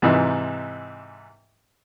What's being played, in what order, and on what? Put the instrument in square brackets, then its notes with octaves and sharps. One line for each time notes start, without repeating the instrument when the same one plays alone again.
[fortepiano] G#2 C3 E3 D#4